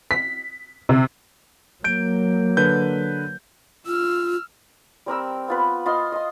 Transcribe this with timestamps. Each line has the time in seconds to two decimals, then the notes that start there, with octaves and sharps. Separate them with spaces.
0.11 B6
0.89 C3
1.84 F#3 A#3 G6 D7
2.57 D3 B4 G6
3.86 F4 E6 F6
5.06 G3 C4 A#4 E6
5.48 B3 F4 B4
5.86 F4 D#5 C6
6.12 D#5 C6